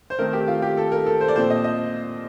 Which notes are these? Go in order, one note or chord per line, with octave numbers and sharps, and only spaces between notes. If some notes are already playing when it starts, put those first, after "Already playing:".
C5
D#3 A3 C4 A#4
G4
F4
G4
A4
A#4
A4
C5
D5
A#2 F3 C4 C5
D#5
D#5